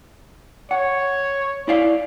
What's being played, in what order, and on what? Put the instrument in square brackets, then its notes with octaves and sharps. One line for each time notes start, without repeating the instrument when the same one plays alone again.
[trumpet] C#5 [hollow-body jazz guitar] F#5
[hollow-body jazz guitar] E4 D5 F5